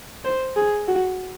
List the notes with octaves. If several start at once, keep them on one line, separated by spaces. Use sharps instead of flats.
C5
G#4
F#4